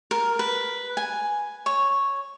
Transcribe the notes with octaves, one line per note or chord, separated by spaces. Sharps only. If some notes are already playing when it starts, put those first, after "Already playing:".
A#4
B4
G#5
C#5